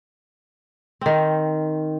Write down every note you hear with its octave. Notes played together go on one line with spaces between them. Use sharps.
D#3 C4